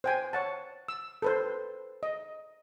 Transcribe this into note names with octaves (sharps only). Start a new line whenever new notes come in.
C5 G5 G#5
C#5 F#5 A5
E6
A4 B4 C5
D#5